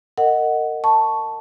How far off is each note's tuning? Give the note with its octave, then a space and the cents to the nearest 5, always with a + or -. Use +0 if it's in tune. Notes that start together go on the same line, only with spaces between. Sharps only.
A#4 -30 D#5 +0 F#5 +0
A5 +0 C#6 +0